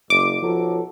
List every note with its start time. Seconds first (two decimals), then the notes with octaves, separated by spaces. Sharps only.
0.10 F#1 D6
0.42 B1 F3 F#3 A4